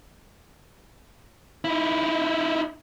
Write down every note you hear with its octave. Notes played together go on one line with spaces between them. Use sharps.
D#4 E4